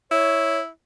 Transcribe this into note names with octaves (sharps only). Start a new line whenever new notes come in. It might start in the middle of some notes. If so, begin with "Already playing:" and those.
E4 C#5